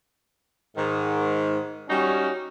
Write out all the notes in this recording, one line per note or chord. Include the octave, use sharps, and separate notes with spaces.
G#2 D#3
G3 C#4 D#4 F#4